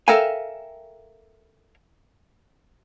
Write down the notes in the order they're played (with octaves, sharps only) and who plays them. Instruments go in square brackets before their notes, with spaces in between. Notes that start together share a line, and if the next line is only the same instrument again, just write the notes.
[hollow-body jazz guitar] A4 A#4 E5 F5 G5 G#5